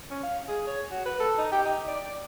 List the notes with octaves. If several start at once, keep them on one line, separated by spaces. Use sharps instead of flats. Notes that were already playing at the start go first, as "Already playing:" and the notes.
C#4
F5
G#4
C#5
F#4
B4
A4
D#4
G4
D#4
D5
D5